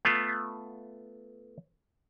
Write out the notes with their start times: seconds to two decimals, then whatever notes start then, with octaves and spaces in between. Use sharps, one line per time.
0.05 A3 B3 F4